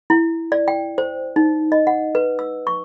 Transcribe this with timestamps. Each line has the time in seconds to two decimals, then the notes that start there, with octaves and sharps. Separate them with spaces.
0.10 E4
0.52 D5
0.68 G5
0.98 C5
1.36 D#4
1.72 D#5
1.87 F#5
2.15 B4
2.39 E6
2.67 C#6